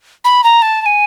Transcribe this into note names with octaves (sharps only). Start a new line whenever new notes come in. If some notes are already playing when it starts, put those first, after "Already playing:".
B5
A#5
A5
A5
G#5